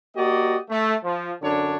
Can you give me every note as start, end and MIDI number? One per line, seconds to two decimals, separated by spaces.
0.16 0.57 58
0.16 0.57 66
0.16 0.57 67
0.16 0.57 74
0.16 0.57 75
0.70 0.95 57
1.04 1.32 53
1.42 1.78 42
1.42 1.78 50
1.42 1.78 62
1.42 1.78 73